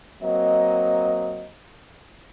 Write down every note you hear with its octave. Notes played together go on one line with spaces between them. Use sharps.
F#3 A#3 C4 D#5